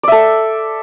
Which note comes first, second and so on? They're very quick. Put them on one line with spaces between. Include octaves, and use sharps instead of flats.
D5 E5 A4